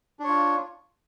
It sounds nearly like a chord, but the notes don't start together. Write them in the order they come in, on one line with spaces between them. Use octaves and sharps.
D4 C#5 F4